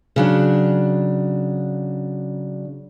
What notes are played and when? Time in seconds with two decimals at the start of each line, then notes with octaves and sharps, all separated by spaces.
0.16 C#3 F#3 D4